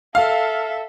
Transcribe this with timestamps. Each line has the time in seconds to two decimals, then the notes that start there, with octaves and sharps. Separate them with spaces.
0.15 A4 E5 F5